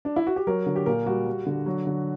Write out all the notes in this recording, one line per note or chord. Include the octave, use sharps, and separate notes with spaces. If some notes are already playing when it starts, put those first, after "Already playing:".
D4
E4
F#4
G4
F#3 A#4
D3
G4
A#2 A#4
G3 F#4
G3
D3
F#3
D3